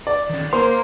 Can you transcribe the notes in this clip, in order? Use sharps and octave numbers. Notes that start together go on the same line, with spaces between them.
D5
D#3 C#4
A#3 C5 F5 A#5 C6